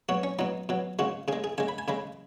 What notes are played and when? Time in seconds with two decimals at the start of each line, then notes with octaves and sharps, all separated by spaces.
0.09 B2 F#3 F#4
0.23 C#4
0.39 B2 F#3 D#4
0.69 B2 F#3
0.99 C#3 G#3 F#4
1.28 C#3 G#4
1.33 G#3
1.44 G#4
1.58 C#3 G#3 G#5
1.68 B5
1.78 G#5
1.88 C#3 G#3 B5